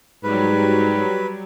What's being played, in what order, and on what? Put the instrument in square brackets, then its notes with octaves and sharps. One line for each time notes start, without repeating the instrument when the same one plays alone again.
[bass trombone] G#2 [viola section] F#3 G3 [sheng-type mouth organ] B4